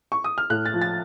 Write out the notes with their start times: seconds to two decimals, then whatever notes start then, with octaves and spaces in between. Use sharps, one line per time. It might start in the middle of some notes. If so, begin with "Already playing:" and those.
0.12 C#6
0.24 D#6
0.38 F6
0.50 A2 F#6
0.66 A6
0.74 F3
0.82 A6